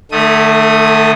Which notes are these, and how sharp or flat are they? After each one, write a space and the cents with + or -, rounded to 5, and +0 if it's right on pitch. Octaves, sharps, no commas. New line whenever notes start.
D3 +45 A3 +0 D#6 +0